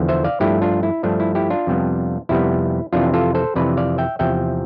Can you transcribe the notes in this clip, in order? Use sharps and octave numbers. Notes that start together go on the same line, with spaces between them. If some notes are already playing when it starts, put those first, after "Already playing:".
Already playing: E2 D3 F3 B3
C5 E5
D5 F5
G2 F3 A3 D4 E4 G4
D4 F4
E4
G2 F3 A3 D4
E4
E4 G4
D4 F4
F2 C3 G3 B3
F2 C3 G3 B3 E4
F2 C3 E3 D4 F4
F4 A4
A4 C5
F2 C3 E3 B4 D5
D5 F5
E5 G5
E2 C3 F3 E5 G5